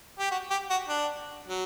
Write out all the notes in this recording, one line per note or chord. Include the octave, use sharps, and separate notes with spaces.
G4
F#4
G4
F#4
D4
F#3